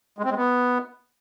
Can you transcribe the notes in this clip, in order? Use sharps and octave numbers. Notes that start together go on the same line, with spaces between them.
G#3
C4
G#3
B3